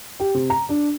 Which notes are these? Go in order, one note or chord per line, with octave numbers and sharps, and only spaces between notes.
G4
C3
A#5
D4